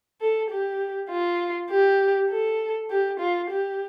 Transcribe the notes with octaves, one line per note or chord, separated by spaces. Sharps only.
A4
G4
F4
G4
A4
G4
F4
G4